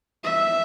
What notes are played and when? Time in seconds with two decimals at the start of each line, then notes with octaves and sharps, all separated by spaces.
0.24 E5